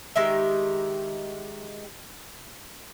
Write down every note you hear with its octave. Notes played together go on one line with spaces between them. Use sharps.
D#3 G#3 G4 E5